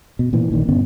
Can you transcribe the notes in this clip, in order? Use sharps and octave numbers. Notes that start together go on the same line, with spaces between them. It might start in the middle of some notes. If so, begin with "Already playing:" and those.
B2
A#2 E3
A#1 A#2 D#3
G2 D3 B3 C#4